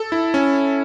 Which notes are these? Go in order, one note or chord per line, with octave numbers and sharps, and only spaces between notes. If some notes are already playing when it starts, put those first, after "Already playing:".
Already playing: A4
E4
C#4